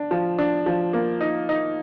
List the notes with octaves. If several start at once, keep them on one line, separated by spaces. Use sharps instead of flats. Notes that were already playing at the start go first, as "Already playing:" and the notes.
Already playing: D4
F3
D4
F3
A#3
D#4
D#4